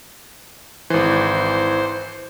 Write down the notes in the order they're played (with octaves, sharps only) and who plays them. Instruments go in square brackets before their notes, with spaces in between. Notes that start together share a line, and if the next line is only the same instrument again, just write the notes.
[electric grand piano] G#1 E3 [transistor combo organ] C5